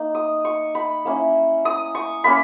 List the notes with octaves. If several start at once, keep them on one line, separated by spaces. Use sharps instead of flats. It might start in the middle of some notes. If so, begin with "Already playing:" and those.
Already playing: A#3 D#4
D#6
C#6
B5
A#3 C#4 E4
D#6
C#6
A#3 C#4 B5